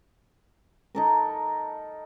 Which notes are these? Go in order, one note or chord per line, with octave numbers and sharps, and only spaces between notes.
D#4 A4 A#4